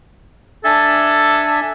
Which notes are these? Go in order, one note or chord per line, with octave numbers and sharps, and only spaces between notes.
D4 A4 E5 G#5